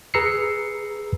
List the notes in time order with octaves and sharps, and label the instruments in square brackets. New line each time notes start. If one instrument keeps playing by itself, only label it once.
[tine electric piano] G#4 B4 A#5 E6 C7 C#7